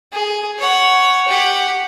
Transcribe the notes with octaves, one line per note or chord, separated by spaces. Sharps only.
G#4
C#5 F#5
G4 F#5